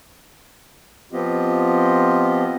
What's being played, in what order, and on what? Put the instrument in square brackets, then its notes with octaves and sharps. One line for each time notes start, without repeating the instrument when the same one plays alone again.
[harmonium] F3 B3 C4 F4 G4 D#5